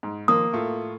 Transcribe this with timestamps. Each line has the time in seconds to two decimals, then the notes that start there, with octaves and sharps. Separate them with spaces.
0.03 G#2
0.28 D#3 F3 A#3 D#6
0.52 A2 A3 F4